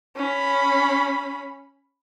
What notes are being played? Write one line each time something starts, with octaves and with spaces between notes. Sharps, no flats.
C#4 B5